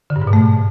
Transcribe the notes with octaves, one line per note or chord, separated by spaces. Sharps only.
D3
G2
G#2
B2
A3